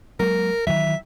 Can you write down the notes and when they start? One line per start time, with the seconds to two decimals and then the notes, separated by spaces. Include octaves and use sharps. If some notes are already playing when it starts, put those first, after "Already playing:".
0.20 F#3 G#3 A#3 A#4
0.67 D#3 E3 F#3 E5